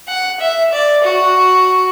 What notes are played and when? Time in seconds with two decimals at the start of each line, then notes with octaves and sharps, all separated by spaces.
0.08 F#5
0.40 E5
0.73 D5
1.04 F#4